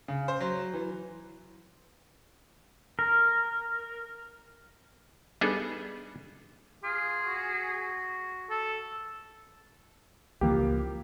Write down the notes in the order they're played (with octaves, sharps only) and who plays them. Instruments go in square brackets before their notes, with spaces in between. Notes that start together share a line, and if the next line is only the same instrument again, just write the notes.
[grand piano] C#3
C5
F#3
E3
[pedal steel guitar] A#4
[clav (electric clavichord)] G3 B3 D4 D#4 G#4 A4
[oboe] F4 [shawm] G#4
[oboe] F#4
[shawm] A4
[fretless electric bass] C#2 E3 F3 [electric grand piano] A#3 G4